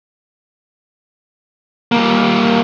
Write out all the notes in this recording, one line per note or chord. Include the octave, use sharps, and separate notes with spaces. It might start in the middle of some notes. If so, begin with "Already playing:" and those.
G3 A#3